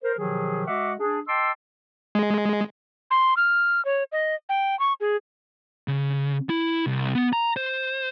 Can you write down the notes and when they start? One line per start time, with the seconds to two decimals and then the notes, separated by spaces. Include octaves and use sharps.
0.03 A#4 C5
0.18 B2 D#3 F3 F#3 G4 G#4
0.67 G#3 F#4 D#5 E5 F#5 D6
0.99 D4 G#4
1.28 D#5 G5 A5 C6 D6 E6
2.15 G#3
3.11 C6
3.37 F6
3.85 C#5
4.12 D#5
4.49 G5
4.79 C#6
5.00 G#4
5.88 C#3
6.49 E4
6.87 C2
7.15 B3
7.33 A#5
7.57 C5